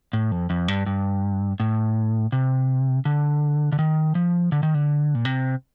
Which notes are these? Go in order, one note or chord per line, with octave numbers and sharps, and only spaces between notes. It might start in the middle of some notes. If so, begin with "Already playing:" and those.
A2
F2
F2
G2
G2
A2
C3
D3
D3
D#3
F3
D3
D#3
D3
A#2
C3